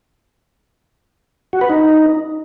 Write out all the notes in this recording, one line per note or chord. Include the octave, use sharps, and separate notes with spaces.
F#4
B4
D#4